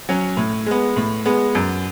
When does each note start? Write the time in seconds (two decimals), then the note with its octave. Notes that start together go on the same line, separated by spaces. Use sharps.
0.09 F#3 C#4
0.37 A2
0.66 G#3 B3
0.96 A2
1.26 G#3 B3
1.55 F#2